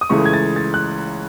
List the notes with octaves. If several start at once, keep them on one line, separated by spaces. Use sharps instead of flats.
D#6
C#2 C#3 E3 A3 C#6
G#6
A6
A6
F#6